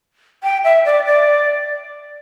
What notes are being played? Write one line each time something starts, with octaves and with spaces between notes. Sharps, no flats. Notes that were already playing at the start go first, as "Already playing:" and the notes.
G5
E5
D5
D5